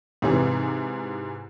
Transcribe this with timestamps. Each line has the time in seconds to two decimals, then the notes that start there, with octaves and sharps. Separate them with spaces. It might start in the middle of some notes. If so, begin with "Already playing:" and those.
0.22 G#2 C3 E3